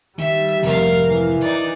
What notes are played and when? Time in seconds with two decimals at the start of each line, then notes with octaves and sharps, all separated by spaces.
0.18 D#3 G3 E5
0.63 F1 G#2 C3 A#4 F5
1.08 E3
1.41 D#4 D5